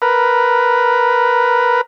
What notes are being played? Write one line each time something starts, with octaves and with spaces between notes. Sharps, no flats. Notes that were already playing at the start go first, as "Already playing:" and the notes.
A#4 B4